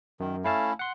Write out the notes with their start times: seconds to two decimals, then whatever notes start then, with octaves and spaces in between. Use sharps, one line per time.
0.20 F#2 D#3
0.44 A3 C#4 E4 F5 A5
0.79 F#5 C6